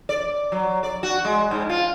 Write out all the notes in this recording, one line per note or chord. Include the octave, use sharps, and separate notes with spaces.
D5
F#3
D5
F#4
G#3
G#2
F4